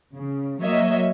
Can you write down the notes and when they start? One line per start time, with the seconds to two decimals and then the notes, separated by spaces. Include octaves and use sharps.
0.15 C#3
0.62 F#3 A#3 C#5 D#5 E5